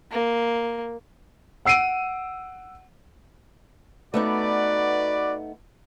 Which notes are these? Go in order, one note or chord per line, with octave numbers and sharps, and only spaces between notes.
A#3
F#5 E6 C7 D7 D#7
A3 B3 D#4 F#4 B4 D5